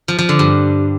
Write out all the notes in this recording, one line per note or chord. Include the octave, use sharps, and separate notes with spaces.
F3
F3
D3
G2